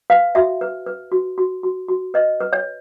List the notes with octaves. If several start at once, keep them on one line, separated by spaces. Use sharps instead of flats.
B4 F5
F#4 E5
B4
B4
F#4
F#4
F#4
F#4
B4 D#5
B4
C#5